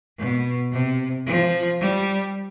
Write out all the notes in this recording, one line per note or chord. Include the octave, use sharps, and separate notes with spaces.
B2
C3
F3
G3